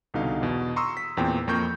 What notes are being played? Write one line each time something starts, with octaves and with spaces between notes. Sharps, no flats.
C2 B2 D3 D#4 F5
E2 B2
A#5 C6 C#6 D#6 E6
B6
E2 A#2 C4 G5
F2 A#3 A#4 C#6 G6